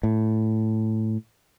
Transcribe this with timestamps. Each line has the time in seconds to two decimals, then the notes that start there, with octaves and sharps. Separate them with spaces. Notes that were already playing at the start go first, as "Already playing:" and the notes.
0.03 A2